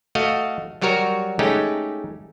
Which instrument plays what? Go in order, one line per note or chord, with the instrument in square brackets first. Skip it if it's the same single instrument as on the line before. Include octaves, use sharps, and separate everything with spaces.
[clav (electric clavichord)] A3 F#4 D#5 F5
F#3 G3 F#4 A#4 C#5
G#3 A3 C#4 D#4 G4